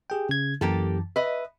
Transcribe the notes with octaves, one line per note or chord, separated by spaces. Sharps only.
G4 G#4 G5
C#3 G#6
F#2 E3 A#3 G4 A4
B4 D#5 E5